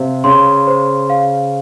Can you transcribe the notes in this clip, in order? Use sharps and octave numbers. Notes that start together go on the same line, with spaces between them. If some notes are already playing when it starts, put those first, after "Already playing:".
Already playing: C3 C5 F5
C#3 C6
C5
F5